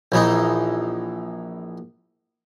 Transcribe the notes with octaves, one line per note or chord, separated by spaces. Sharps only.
A#1 E3 D#4